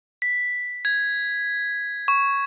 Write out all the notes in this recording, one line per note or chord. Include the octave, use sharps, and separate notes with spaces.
B6
G#6
C#6